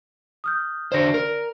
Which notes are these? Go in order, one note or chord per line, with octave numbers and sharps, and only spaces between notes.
D#6 F6 G6
D3 C5 D5 A#6
A#4